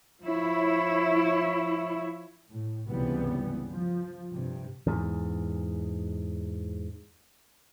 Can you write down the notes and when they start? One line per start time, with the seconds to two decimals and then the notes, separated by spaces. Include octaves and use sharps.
0.22 F3 E4 C#5
2.49 A2
2.88 C#2 G2 C3 E3 G3 B3
3.71 F3
4.31 G2 C3
4.87 E2 G#2